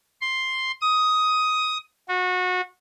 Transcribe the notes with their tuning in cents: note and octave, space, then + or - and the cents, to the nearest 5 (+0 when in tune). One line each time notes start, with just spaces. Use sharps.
C6 +5
D#6 +10
F#4 -25